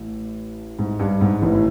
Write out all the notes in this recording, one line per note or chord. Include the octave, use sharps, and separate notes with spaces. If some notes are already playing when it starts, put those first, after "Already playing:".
Already playing: A1 A2
G#2
G2
G#2
A1 A2
A2